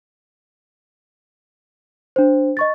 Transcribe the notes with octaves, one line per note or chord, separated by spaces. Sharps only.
D4 C5
D#5 C#6 A6